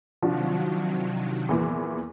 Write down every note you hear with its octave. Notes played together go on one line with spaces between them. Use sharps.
C3 D#3 F3 F#3 D4 F#4
E2 A#2 E3